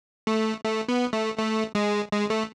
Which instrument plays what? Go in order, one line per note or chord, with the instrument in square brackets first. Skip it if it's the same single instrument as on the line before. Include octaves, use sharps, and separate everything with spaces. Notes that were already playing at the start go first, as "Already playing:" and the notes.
[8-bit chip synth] A3
A3
B3
A3
A3
G#3
G#3
A3